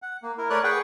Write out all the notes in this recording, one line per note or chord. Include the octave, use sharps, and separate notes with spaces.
F#5
A#3
E4 A#4
A3 A#4 B4 C#5 D5 F#6
G#4 B4 F#5 G5 C#6